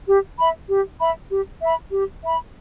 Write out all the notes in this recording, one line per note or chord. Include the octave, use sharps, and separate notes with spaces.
G4
E5 B5
G4
E5 B5
G4
E5 B5
G4
E5 B5